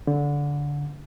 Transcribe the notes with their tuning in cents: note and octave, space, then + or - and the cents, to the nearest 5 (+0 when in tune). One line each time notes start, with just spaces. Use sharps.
D3 -20